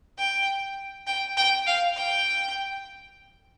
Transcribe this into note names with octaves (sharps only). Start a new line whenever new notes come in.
G5
G5
G5
F5
G5